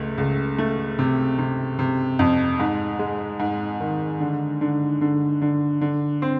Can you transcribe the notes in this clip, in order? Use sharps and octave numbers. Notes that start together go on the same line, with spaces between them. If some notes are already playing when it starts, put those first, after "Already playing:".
Already playing: C#2 A3
C#2
A3
C3
C3
C3
F2
G#2
G#3
G#2
D#3
D3
D3
D3
D3
D3
C4